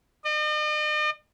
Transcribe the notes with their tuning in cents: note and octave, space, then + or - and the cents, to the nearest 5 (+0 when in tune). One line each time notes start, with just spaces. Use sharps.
D#5 -45